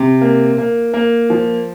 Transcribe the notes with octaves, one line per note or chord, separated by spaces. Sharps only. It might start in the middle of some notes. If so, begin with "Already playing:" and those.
Already playing: C3
A#3
A#3
A#3
F3